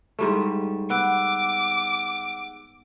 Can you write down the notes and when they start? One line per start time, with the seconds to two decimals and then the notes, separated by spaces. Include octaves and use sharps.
0.19 G#2 G3 A3
0.90 B3 F#5 D6 E6 F#6